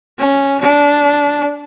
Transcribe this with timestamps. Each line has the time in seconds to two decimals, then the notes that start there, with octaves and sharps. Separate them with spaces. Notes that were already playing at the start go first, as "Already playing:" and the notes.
0.19 C#4
0.61 D4